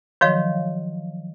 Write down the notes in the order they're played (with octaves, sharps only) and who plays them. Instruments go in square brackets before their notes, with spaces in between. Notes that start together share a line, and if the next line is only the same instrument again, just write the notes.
[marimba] D#3 F3 F#3 [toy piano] F#4 C#5 F5